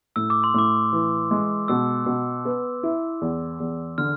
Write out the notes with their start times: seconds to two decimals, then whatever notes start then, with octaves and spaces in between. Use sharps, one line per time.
0.16 A2 E6
0.30 D6
0.44 C6
0.54 A2 D6
0.93 E3
1.31 G#3
1.68 B2 E6
2.06 B2
2.45 B3
2.83 E4
3.21 E2
3.60 E2
3.98 D3 F6